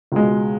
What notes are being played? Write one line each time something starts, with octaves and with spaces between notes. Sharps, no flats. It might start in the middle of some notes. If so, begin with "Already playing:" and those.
C#2 B2 G#3